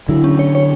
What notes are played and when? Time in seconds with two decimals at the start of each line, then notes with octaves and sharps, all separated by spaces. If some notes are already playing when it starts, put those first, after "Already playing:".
0.09 D3 F#3 E4
0.24 C#4
0.39 C#5
0.55 C#5